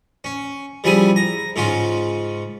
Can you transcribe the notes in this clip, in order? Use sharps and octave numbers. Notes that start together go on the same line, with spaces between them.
C#4
C#3 F3 G3 E4 G#4 G#5
A#5
G#2 C#3 C#4 F4